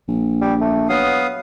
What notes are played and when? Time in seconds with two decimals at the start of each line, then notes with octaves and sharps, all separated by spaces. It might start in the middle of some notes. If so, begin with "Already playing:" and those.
0.08 A#1
0.41 G3
0.61 A3
0.89 F#3 B3 F5 D#6